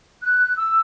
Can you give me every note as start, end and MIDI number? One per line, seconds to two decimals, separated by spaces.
0.22 0.56 90
0.56 0.80 88